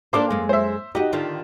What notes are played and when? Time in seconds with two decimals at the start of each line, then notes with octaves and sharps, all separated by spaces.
0.13 A#3 D4 A4 C5 F5 D6
0.30 F#2 G#3
0.49 C5 E5
0.95 D#4 F#4 G4 D#5
1.13 D3 D#3 F4